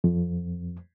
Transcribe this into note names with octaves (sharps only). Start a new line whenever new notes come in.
F2